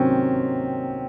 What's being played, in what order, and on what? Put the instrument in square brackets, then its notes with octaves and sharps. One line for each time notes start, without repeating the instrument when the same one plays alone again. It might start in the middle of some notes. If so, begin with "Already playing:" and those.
Already playing: [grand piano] C3 D#3 F#3 C4 C#4